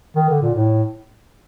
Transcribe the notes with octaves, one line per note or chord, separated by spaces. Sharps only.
D#3
D3
A#2
A2